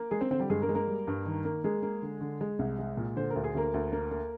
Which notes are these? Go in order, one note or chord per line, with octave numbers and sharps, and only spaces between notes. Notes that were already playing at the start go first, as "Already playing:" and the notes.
Already playing: A#3
G#3 G#4
C4 C5
D3 C4 C5
G3 G4
G2 G#3 G#4
A#3 A#4
G#3
A#3 A#4
G3
G2
D#3
A#3
G#3 A#3 G#4
A#3
D3
D3
G#3
C2
G#3
A#2
D3 C5
A#4
D2
G#4
D2 A#3 A#4
D2
A#3
A#3